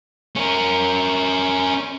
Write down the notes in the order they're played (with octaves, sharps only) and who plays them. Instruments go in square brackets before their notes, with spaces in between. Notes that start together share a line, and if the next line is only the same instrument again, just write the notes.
[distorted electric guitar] C#4 A#4